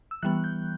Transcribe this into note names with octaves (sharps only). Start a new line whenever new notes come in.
E6
E3 G3 B3 F#6
G6